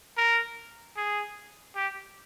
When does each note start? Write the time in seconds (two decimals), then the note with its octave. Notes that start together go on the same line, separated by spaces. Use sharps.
0.17 A#4
0.97 G#4
1.75 G4